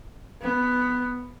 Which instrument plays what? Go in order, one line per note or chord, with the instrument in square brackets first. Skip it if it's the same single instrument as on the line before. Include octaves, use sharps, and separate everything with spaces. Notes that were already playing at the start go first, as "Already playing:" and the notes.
[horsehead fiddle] B3